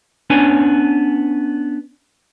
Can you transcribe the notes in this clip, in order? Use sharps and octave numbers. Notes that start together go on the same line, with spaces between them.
B3 C#4 D4 B4 C#5 G#5